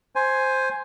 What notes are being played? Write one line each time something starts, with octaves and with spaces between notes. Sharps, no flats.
C5 G#5